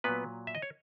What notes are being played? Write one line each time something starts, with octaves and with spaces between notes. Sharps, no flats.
A#2 F#3 B3 B4
E5
D#5
C#5